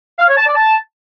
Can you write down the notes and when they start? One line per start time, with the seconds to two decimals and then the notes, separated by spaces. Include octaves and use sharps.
0.19 F5
0.28 C#5
0.37 A5
0.46 D5
0.55 A5